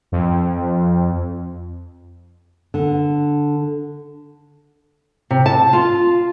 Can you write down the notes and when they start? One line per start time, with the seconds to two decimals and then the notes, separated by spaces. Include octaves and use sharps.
0.12 F2
2.74 D3
5.31 C3
5.46 A5
5.73 F4